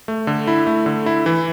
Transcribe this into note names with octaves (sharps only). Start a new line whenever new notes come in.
A3
D3
E4
A3
D3
E4
E3